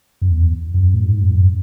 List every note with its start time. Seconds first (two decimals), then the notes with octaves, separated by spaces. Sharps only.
0.22 F#2
0.29 E2
0.74 F#2
0.94 A2
1.07 G#2
1.20 F#2
1.34 F#2